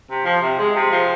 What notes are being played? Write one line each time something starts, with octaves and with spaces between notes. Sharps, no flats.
C3
F3
C3
G#3
C3
F3